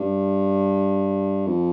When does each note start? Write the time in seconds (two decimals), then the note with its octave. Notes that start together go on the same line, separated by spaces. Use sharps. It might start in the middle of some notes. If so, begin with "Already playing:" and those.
Already playing: G2
1.47 F2